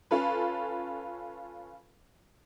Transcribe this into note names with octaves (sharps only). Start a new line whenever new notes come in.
C#4 F4 A4 B4